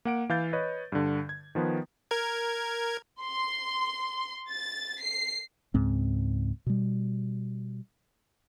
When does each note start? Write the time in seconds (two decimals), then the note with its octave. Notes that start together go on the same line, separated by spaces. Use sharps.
0.05 A#3 F#5 D7
0.29 E3 F5 G6 A6
0.53 B4 C#5 D#5
0.92 G2 D3
1.29 G#6
1.55 D#3 F3 B3 B4
2.11 A#4 G#6
3.21 C6
4.52 A6
5.02 C7
5.74 C#2 G#2 C4
6.66 B2 G3